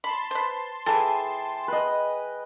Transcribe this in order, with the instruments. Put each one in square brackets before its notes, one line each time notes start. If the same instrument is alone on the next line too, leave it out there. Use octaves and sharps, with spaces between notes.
[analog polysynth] A5 C6 [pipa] B5
[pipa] B4 C5
[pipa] E3 A4 [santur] G#4 G5 G#5
[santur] B4 D#5